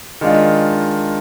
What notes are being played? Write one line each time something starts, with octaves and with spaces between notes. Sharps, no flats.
D#3 G#3 D4 F4